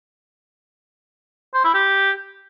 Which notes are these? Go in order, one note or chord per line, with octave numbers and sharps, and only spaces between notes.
C5
E4
G4